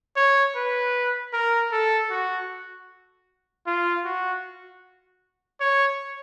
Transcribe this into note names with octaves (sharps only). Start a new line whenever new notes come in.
C#5
B4
A#4
A4
F#4
F4
F#4
C#5